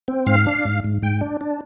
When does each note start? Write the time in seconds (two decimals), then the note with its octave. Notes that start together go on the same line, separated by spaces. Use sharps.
0.08 C4
0.26 G#2 F5
0.47 D4
0.65 G#2
0.84 G#2
1.02 G#2 G5
1.21 D4
1.41 D4